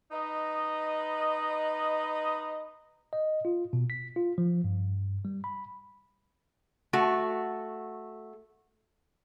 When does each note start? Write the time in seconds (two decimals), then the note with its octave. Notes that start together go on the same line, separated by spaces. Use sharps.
0.11 D#4 B4 D#5
3.13 D#5
3.45 F4
3.73 B2
3.90 B6
4.16 F4
4.38 F3
4.64 G2
5.25 G3
5.44 B5
6.93 A3 F#4